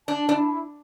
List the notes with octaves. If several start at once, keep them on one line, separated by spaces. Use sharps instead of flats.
D4 A5
D4 E4